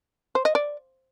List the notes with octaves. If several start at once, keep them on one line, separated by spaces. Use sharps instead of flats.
C5
D#5
D5